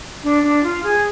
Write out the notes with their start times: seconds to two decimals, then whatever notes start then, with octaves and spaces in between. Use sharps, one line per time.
0.24 D4
0.43 D4
0.63 F4
0.84 G#4